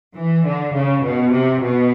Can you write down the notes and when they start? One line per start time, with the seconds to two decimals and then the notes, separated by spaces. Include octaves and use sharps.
0.16 E3
0.45 D3
0.74 C#3
1.04 B2
1.32 C3
1.62 B2